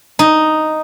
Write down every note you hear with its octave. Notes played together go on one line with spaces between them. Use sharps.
D#4